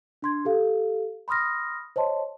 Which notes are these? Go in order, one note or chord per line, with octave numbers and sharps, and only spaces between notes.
D4 C6 G#6
G4 A4 F5
B5 C6 D#6 F6 A#6
C5 C#5 D#5 A5 C6